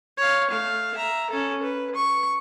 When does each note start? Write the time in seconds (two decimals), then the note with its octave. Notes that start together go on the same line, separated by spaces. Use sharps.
0.17 C#5 F5
0.49 A3 F5
0.94 E5 A#5
1.30 C#4 A4
1.62 B4
1.95 C#6